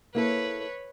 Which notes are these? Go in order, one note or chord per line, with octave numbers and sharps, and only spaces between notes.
A#3 E4 A4 B4 C#5